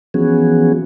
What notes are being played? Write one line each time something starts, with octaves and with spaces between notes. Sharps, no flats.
E3 F3 B3 C#4 F#4 G#4